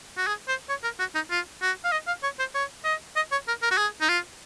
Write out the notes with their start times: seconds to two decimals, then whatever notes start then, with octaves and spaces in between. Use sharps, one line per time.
0.17 F#4
0.27 G#4
0.48 C5
0.69 C#5
0.83 A#4
0.99 F#4
1.15 D#4
1.30 F4
1.62 F#4
1.84 F5
1.92 D#5
2.07 F5
2.23 C#5
2.39 C5
2.54 C#5
2.85 D#5
3.16 D#5
3.32 C#5
3.48 A#4
3.62 A#4
3.71 F#4
3.78 G#4
4.01 D#4
4.09 F4